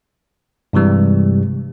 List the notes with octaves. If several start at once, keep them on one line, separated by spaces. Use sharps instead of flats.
G2 C3 E3 G3 G#3